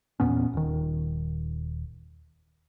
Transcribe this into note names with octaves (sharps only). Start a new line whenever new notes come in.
E2 A#2 B3 C#4
D#1 D#3